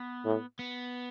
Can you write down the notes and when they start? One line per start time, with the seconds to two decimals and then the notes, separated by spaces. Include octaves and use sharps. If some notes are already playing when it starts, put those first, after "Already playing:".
Already playing: B3
0.25 A2
0.59 B3